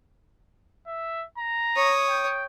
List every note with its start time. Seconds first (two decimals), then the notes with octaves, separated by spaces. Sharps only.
0.87 E5
1.38 A#5
1.76 C#5 D#6
2.09 G5